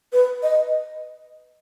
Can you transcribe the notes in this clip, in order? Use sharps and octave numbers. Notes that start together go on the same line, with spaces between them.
B4
D#5